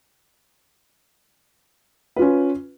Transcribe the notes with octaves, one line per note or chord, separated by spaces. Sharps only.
C#4 F4 B4